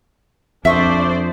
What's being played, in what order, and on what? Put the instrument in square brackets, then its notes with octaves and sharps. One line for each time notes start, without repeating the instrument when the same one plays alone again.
[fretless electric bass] F2 [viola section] D4 C5 D5 [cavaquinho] E5 C#6 D#6